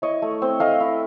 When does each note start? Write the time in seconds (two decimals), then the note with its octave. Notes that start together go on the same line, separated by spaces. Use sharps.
0.02 E4 C#5 D#5
0.22 A3
0.42 C4
0.60 A3 D#5 F5
0.80 E4